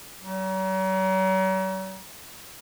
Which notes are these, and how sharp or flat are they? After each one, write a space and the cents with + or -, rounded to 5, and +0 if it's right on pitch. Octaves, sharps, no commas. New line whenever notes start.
F#3 +45